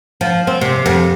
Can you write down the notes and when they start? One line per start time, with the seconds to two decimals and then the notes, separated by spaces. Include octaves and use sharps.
0.21 F3
0.47 C4
0.61 C3
0.86 F2